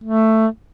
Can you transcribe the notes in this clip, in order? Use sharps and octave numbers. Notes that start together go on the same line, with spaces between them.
A3